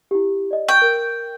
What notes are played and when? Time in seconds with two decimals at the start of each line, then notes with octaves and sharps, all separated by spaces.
0.11 E4 G4
0.51 D5 D#5
0.68 G5 C#6
0.82 A#4